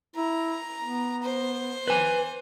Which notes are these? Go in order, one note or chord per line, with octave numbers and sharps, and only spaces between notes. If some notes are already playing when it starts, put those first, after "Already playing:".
E4 A#5
B3
C5
B4 G#5